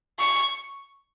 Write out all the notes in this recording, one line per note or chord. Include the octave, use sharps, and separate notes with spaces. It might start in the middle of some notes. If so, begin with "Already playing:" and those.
C#6